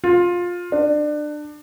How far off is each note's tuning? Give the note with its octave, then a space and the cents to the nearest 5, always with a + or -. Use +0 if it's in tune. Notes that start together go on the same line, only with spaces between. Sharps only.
F4 +15
D4 +25